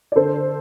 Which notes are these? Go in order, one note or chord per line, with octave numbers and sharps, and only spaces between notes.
D5
D3 A4 C5